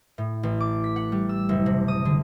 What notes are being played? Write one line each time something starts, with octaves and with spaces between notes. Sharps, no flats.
A2
A1
D6
B6
F#5
G3
E6
F#1
C3
D#6
D3